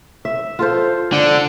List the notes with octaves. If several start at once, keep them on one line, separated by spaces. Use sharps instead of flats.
E5
F4 A4 C5
D3